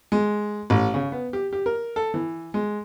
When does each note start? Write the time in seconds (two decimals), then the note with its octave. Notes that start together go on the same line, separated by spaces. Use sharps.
0.12 G#3
0.70 A1
0.94 C#3
1.12 B3
1.33 G4
1.53 G4
1.66 A#4
1.96 A4
2.14 E3
2.54 G#3